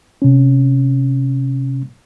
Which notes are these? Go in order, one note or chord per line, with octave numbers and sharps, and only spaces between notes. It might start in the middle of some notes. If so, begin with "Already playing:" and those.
C3 C#4